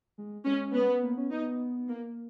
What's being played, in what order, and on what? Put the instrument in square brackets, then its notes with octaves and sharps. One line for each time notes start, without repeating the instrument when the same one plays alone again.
[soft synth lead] G#3
[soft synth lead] G#3 [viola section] C#4
[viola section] B3
[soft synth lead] A#3
C#4
[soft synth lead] B3 [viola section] D#4
[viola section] A#3